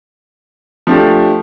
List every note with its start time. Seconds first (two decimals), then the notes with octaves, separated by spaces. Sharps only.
0.87 F3 A3 D4 G4